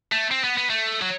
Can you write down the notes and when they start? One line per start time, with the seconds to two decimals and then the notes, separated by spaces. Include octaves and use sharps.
0.12 A3
0.31 C4
0.44 B3
0.57 B3
0.70 A3
1.01 F#3